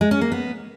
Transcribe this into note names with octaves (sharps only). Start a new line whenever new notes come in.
G#3
C#4
A#3
B3